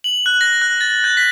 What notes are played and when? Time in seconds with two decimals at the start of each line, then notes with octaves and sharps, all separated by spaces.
0.04 F#7
0.26 F#6
0.41 A#6
0.62 F#6
0.81 A6
1.04 G6
1.17 B6